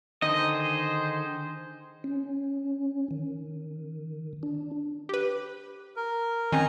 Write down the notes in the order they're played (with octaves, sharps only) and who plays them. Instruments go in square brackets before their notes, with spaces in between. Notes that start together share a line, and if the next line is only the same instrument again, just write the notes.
[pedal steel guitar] D3 D#3 D#4 [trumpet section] G#4 C5 [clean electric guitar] D#5
[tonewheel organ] C#4
D#3
D4
[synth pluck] G4 B4
[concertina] A#4
[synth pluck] D#3 C4 C#4 [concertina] D#5 G#5 A#5